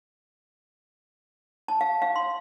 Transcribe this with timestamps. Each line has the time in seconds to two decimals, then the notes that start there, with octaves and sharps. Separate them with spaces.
1.68 A5
1.81 F5
2.02 F5
2.16 C6